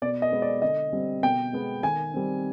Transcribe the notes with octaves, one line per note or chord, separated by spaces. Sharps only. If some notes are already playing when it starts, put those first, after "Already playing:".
B2 D5
D#5
G#3 B3
D5
D3 D#5
G3 C4
B2 G5
G#3 B3
D#3 G#5
G3 C4